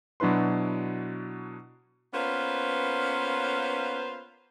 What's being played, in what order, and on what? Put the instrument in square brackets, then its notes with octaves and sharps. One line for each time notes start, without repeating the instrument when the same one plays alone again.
[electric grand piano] B2 F#3 D4 E4 B4 C6
[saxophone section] A#3 B3 C#4 F4 B4 C5